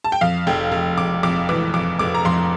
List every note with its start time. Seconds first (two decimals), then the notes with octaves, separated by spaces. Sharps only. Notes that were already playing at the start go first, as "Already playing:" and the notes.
0.04 A5
0.12 G5
0.21 F2 F5
0.47 F1 G5
0.72 F1
0.98 F1 D6
1.23 F2 D6
1.49 E3 D6
1.74 F2 D6
1.99 F1 D6
2.15 A#5
2.25 F2 C6